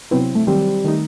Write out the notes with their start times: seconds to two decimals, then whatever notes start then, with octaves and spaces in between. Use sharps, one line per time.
0.11 C3 F#3 B3 C4 E4
0.35 A3
0.47 D#3 F#3 G3 C4
0.84 D#3 A3 D#4